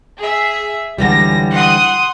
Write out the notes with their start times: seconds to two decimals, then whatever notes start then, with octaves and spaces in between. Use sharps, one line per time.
0.19 G#4 E5
0.98 C#2 D3 E3 G3 A#6
1.52 F#5 C6 D#6